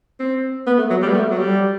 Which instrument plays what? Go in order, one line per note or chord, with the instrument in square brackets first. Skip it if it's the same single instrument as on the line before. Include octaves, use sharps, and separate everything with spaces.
[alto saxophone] C4
B3
A3
F#3
G3
B3
A3
F#3
G3